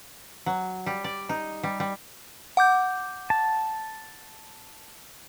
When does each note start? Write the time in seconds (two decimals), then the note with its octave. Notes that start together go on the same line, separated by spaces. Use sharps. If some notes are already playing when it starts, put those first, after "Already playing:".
0.46 F#3
0.86 G3
1.04 D5
1.29 D#4
1.63 G3
1.80 G3
2.57 F#5 D6 G6
3.30 A5